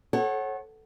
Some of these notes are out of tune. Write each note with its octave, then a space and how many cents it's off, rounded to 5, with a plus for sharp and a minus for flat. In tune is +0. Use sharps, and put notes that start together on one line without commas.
A4 -30 C#5 -30 F#5 +15